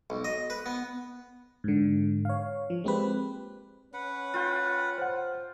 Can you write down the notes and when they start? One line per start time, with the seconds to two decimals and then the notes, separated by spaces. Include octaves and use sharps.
0.10 B1
0.25 D#5
0.50 B4
0.66 B3
1.64 G#2 D3
2.25 C#5 F5
2.70 F3
2.84 G#3 A#3 C4 G4 B4
3.94 C#4 B4 F#5
4.34 F4 G5
4.98 C5 F#5